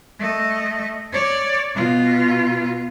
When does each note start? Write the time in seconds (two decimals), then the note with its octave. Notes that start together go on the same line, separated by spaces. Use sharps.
0.19 A3 D#5
1.12 C#5 D5
1.75 B2 F4